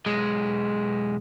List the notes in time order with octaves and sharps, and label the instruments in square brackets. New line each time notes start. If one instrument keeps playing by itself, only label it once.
[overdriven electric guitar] B1 G#3